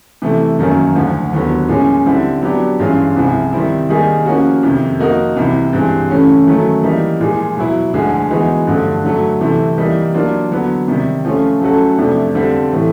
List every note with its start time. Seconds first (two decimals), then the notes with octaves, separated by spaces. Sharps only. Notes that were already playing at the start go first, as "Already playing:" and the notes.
0.22 C3 E3 A3
0.58 F#2 D#3 F#3 A#3 C#4
0.96 D2 D3 F3
1.32 D#2 D3 F#3 B3
1.69 A#2 F3 G#3 C#4
2.06 D3 G3 C4 E4
2.42 F#3 B3 D4 G4
2.79 G2 E3 G#3 C#4 F4
3.16 C2 C3 F3 G#3
3.53 D#3 G3 C4 E4
3.89 D#3 G3 A#3 D#4 G#4
4.26 F3 A#3 C#4 F#4
4.63 F2 C3 D#3
4.99 F3 A#3 D#4 F#4 A#4
5.36 C2 C3 E3
5.73 G2 E3 G#3 C4
6.10 C#3 E3 A3 C#4
6.47 D#3 F#3 A3 C#4
6.84 E3 G3 A#3 D#4
7.20 A#2 F3 G#3
7.57 B2 F#3 B3 E4
7.94 D2 D3 F3 G#3
8.30 E3 G#3 B3 D#4 F#4
8.67 G2 D3 F3 A3
9.04 D3 F#3 A3
9.41 C3 E3 A3 C4
9.78 E3 G3 A#3 D#4
10.14 F#3 A#3 D4 F4
10.51 D3 F#3 B3
10.88 C3 D#3 G3
11.25 F3 A3 C#4 F4
11.62 F#3 A3 C#4 F#4 A4
11.98 F2 C3 F3 A3 D4
12.35 D3 G3 C4 F4 A4
12.72 A2 E3 A3